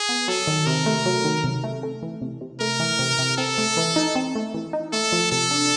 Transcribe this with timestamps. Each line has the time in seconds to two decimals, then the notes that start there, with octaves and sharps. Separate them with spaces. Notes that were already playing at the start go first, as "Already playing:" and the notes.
Already playing: G#4
0.09 B3
0.28 F#3 A4
0.47 D#3
0.66 C3 A#4
0.86 A3
1.06 F#3
1.25 D#3
1.44 C3
1.64 A3
1.83 A3
2.03 E3
2.21 C3
2.41 C3
2.60 A3 A#4
2.80 E3
2.99 C3
3.18 C3
3.37 C4 A4
3.58 A3
3.77 E3
3.96 D#4
4.15 C4
4.35 A3
4.54 E3
4.73 D#4
4.93 A3 A4
5.12 F3
5.32 C3 A4
5.51 D4